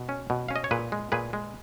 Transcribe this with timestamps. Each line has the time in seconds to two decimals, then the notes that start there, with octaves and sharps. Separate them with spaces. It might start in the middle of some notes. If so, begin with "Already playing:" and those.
Already playing: B2
0.09 C#4
0.30 B2
0.49 C#4 F5
0.56 D#5
0.64 C#5
0.71 A#2 G#4 B4
0.92 G#3
1.12 A#2 G#4 B4
1.33 G#3